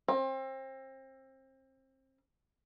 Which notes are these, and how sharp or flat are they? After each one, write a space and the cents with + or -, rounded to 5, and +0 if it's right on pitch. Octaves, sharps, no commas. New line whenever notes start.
C4 +30